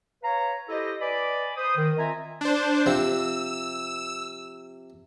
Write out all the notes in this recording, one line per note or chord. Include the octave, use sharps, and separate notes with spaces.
B4 C#5 F5 A#5
E4 G4 A4 C5 D#5
B4 D5 D#5 G#5 B5 D6
C5 D#6
D#3
C4 F4 D#5 E5 G#5 A#5
D4 C5
C3 F3 E6